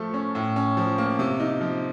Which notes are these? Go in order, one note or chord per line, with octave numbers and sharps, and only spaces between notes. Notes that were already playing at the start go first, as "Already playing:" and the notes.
Already playing: F3 A3 A4
C#4
A2
C#4
F3
A#3
C3
D#4
F3